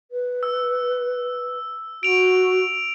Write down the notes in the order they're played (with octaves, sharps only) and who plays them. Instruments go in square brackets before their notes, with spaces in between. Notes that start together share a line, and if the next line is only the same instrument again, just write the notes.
[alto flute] B4
[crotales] E6
[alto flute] F#4 [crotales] D7 F7